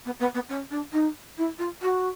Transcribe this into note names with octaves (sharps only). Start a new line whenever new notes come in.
B3
B3
B3
C#4
D4
D#4
E4
F4
F#4